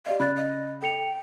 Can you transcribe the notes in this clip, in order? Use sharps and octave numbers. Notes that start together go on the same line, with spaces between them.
G4 D5 D#5 F5
C#3 D5 B5 F#6 A6
D#5
A4 G5 C#7 F7